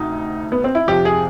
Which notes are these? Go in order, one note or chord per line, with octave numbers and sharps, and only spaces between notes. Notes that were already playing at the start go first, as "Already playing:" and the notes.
Already playing: D2 C3 D#4
B3
C4
E4
F2 C3 F3 G4
G#4